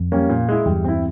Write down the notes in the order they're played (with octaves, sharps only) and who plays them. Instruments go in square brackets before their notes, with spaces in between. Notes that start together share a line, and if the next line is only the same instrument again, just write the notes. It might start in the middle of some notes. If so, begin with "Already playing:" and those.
Already playing: [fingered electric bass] F2
[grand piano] G3 A#3 C#4
A#2
G#3 E4
[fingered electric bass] E2 G2 [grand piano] G3
[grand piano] C4 E4